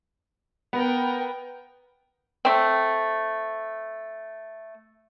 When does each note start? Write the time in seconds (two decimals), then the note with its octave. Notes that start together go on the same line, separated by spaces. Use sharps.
0.73 B3 A#4 G5
2.45 A3 C4